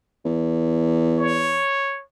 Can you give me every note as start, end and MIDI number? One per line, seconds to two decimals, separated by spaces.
0.25 1.64 40
1.19 2.02 73